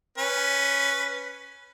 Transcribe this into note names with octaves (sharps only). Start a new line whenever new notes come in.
C#4 B4